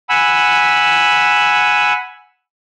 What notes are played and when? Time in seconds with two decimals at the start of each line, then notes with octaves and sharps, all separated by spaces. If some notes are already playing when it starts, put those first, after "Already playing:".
0.09 F#5 G#5 B5 E6